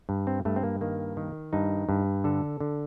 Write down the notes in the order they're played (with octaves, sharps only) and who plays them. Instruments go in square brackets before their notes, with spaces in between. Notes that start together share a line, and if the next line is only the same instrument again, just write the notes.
[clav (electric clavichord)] G2
C4
G2 A3
C4
A#3
D#3 A#3
D#3
G2 D#4
G2
D3 A4
D3